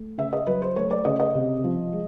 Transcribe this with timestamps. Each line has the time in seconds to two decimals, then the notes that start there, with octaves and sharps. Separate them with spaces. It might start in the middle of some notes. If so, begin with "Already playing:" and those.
Already playing: A3
0.18 C#3 E5
0.33 D#5
0.47 F#3 B4
0.62 C5
0.76 A3 C#5
0.91 D5
1.05 C#3 D#5
1.20 D#5
1.35 C3
1.64 F3
1.92 G#3